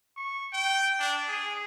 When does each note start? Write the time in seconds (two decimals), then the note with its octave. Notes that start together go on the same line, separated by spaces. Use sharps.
0.16 C#6
0.52 G5
0.99 D4
1.28 G#4